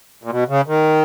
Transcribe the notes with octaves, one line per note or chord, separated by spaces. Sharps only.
A#2
B2
C#3
D#3